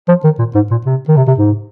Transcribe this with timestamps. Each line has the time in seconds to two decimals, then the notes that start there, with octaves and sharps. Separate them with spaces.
0.08 F3
0.24 D#3
0.39 A#2
0.55 G#2
0.71 A#2
0.86 C3
1.08 D#3
1.17 C3
1.28 C3
1.38 G#2